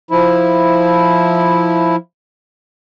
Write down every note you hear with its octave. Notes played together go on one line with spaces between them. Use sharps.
F3 E4